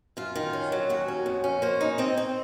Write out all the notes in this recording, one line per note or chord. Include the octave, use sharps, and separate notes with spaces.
F#2 F4
D#3
C#4
F#3
D#2 F#4
C#4
F2
C#4
A#3 C5
D#4
C4 D#5
C4